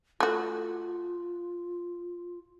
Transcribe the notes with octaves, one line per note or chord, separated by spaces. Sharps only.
A3 F4 F#4